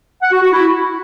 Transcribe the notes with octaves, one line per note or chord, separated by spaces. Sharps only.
F#5
F#4
F#4
E4